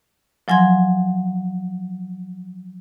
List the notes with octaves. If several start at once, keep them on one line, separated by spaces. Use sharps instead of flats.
F3 F#3 G#5 C6 G#6